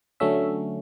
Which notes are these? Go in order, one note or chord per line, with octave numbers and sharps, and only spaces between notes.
D3 F#3 A3 C#4 E5